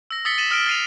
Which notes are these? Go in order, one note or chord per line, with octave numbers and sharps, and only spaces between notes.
E6 A#6
D#6 E6 A6 B6 C#7 G7
A6 D#7 E7 F#7
D#6 F6 A#6 D7
A6 C7 D#7 F7